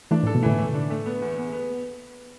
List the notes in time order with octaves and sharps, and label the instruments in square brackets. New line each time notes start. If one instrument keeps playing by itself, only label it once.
[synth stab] E3 A3 [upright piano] D4
[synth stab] A2
[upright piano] A4
[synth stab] B2
[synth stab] A2 D3 [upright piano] E3
[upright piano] A3
D4
A3
B3
E2
B3
B3